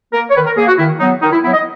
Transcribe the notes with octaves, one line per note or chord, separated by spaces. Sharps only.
A#3 A#4
C#5
D#3 B4
A#4
A#3 G#4
F#4
D#3 E4
F#3 B3 D#4
D#3 D#4
E4
F#3 B3 E4
D#5